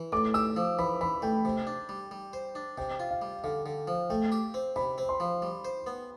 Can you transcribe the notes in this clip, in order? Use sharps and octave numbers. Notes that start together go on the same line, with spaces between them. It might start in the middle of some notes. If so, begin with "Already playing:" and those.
Already playing: E3
A2 D6
G4 E6
F3
E3 B5
E3 B5
A3 G5
C3
D4
G3
G3
C5
D4
C3 G5
F4
F5
G3
D3 F5
D3
F3
A3 G5
G4
C4
C3 B5
C4
C6
F3
G3
C5
B3